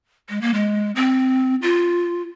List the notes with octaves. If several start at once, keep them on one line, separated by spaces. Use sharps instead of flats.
G#3
A#3
G#3
C4
F4